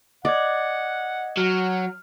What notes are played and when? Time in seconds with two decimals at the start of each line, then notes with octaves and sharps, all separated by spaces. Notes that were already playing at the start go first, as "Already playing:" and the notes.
0.25 D5 D#5 F#5 G#6
1.38 F#3 F6